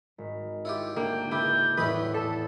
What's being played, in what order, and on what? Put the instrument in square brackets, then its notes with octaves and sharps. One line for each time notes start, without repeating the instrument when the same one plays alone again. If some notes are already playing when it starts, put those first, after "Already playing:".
[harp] G#1
[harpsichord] E4 F4 G4 [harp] C#5
[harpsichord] D3 [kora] A#3 [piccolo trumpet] G5
[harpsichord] C#2 D4 [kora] E4 [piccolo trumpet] G6
[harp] E2 A2 E3 [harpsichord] E4 C#5 D#5 [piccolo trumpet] G4 [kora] B4
[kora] A4 [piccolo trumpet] A5